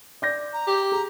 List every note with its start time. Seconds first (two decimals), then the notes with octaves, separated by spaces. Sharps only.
0.22 D5 G6 A#6
0.53 A#5
0.67 G4
0.92 G#4 A#5